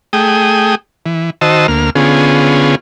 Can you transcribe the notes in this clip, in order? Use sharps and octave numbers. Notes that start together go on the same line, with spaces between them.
A3 G#4 G5 D#6
E3
D#3 F#4 C5 D#5 A5 E6
D2 A#3 F6
D3 B3 C#4 F4 G#4